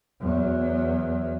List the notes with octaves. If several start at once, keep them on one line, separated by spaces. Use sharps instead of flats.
E2 F#3